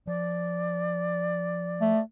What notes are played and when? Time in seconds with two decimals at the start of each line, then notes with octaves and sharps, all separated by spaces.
0.07 F3 D5
1.81 A3